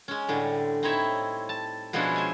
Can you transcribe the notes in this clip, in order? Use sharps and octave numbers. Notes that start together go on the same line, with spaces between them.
G#3 C#4
A2 D3 G3
C4 D#4 E4 C#5 E5
A5
B2 F3 G#3 C#4 D4 E4
C5 G#5